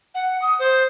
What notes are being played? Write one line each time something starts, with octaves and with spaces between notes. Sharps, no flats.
F#5
D#6
C5